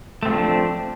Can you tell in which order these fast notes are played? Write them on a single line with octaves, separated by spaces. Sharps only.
A3 C4 F3 D4